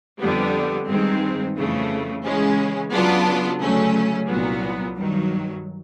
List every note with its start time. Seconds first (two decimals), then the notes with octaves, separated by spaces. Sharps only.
0.19 F2 D3 G3 B3
0.87 G2 D#3 G#3 C4
1.55 F2 C#3 E3 A3
2.24 C#3 E3 G#3 C#4
2.92 C#3 F#3 B3 D4 F4
3.60 D2 C#3 F#3 A3 C#4
4.28 C2 A#2 F#3 B3
4.96 G2 D#3 F#3